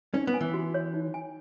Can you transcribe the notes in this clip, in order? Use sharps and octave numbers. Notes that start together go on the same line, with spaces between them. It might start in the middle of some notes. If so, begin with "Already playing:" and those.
C#4 D#4
B3
G#5
E3
F#4
C#5
D#4
G#5